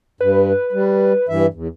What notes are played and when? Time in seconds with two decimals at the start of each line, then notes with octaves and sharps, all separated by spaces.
0.21 G2 B4
0.72 G3
1.29 G2 E3 E5
1.54 E2